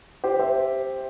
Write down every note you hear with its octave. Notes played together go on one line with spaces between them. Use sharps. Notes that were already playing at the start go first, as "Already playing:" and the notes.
G4 C5
C5 E5